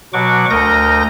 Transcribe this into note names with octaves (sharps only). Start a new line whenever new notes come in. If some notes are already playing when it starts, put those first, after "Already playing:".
B2 F#3 F#4 F#5 C#6 D6
D2 A#4 D#6 G6 A#6